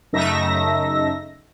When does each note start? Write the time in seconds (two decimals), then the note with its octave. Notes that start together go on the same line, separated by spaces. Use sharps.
0.13 F#2 C#3 A3 D#4 E5 A#6